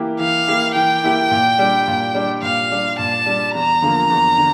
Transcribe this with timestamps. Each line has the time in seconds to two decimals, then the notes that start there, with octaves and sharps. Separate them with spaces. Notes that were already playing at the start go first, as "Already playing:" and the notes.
Already playing: E3 A#3 E4 G4
0.19 E3 F5
0.48 A#3 E4 G4
0.76 E3 G5
1.04 A#3 E4 G4
1.31 A#2
1.59 G3 D4
1.87 A#2
2.15 G3 D4
2.42 A#2 F5
2.71 G3 D4
2.99 A#2 A5
3.26 G3 D4
3.54 E2 A#5
3.82 D3 F3 A#3
4.10 E2
4.38 D3